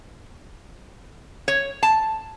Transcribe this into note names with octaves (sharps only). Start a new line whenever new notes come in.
C#5
A5